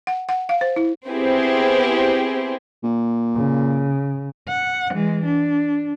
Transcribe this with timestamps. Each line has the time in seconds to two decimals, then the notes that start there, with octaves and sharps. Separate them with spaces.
0.07 F#5
0.29 F#5
0.49 F5
0.61 C5
0.76 E4
1.08 B3 C4 E4 G4 G#4 C5
2.84 A#2
3.36 C#3
4.49 F#5
4.92 E3 G#3
5.25 D4